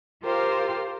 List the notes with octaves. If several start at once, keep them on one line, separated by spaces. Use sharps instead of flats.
F4 G4 A#4 C5 F5